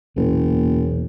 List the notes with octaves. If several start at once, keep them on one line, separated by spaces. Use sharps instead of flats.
F#1 B1 E2 A#2